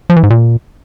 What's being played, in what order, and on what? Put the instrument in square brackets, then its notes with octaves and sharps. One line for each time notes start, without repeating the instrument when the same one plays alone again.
[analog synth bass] F3
E3
G#2
A#2